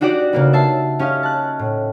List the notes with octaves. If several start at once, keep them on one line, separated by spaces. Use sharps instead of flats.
D4 D#4 F#4 G4 D5 F#5
C#3 A#3 B3
E5 A5 C7
C#4 G4 D#5 F5
A5 F#6
A2